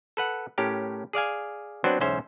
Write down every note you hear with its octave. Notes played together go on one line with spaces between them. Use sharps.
A4 B4 F#5
A2 C#4 G4 A#4
G#4 D5 F5 G#5
F#3 B3 C4 D4 B4 C5
B1 E2 G#2 C#4 C5 E5